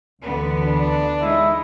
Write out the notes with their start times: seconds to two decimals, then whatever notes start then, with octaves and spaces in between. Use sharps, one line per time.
0.23 D2 D3 E3 B3
0.62 D4
1.22 G#3 D#4 E4